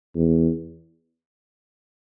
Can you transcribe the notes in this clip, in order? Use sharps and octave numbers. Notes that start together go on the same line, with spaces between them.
E2